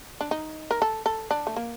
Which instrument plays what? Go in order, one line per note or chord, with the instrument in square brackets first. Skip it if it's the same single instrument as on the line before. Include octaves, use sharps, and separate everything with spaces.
[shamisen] D4
D#4
A#4
A4
A4
D4
A3
A#3